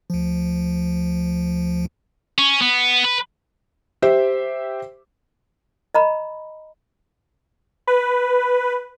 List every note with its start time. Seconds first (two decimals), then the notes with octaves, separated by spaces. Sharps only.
0.10 D2 F3
2.38 C#4
2.62 B3
3.04 B4
4.02 G4 C5 E5
5.95 D#5 A#5 B5
7.87 B4